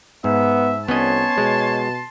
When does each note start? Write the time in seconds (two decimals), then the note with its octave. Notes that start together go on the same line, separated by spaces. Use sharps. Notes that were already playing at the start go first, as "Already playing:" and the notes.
0.24 G#2 B3 E5
0.88 C2 B3 C#4 C#5 D#5 A5 C6
1.38 B2 G#3